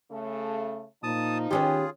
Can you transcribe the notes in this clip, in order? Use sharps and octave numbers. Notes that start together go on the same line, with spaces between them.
C#3 A3
A#2 F3 D#4 A5 D#6
D#3 B3 C#4 F4 G4 G#4